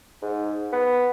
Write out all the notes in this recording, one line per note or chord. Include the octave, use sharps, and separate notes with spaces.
G#2
B3